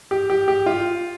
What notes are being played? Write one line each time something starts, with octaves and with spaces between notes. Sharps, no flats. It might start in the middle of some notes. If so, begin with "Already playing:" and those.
G4
G4
G4
F4